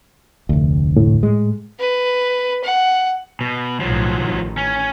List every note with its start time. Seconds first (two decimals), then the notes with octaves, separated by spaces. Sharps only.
0.49 F1 D2
0.96 A2
1.23 G#3
1.79 B4
2.63 F#5
3.41 B2
3.80 B1 A2 F3 F#3
4.20 A1 D#3
4.58 C#4